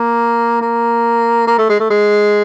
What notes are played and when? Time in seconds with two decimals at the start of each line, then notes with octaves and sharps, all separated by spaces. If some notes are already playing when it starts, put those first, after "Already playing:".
Already playing: A#3
0.62 A#3
1.47 A#3
1.58 A3
1.69 G#3
1.80 A3
1.90 G#3